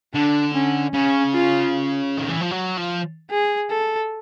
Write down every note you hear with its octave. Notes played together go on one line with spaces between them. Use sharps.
D3 D4
C#4
C#3 C#4
F4
D#3
E3
F3
F#3
F3
G#4
A4